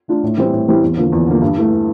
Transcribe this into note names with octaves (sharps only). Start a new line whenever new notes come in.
A3 D4 F4
A2
E3 G3 C4 E4
A2
E3 G3 C4 E4
E2
D3 F3 A#3
E2
D3 F3 A#3
G2
E3 A3